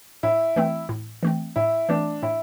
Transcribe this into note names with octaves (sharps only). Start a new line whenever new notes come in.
A2 E4
E3 A3 C4
A2
E3 A3 C4
A2 E4
E3 A3 C4 D4
A2 E4